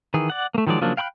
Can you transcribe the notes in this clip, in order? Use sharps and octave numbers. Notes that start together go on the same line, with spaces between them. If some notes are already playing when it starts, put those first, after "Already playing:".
D#3 E3 G#4
D5 F#5
A3 A#3
D#3 F3 F#3 G#3 D5
C#3 F3 F#3 A#3 D4
F5 G5 B5 C6 F#6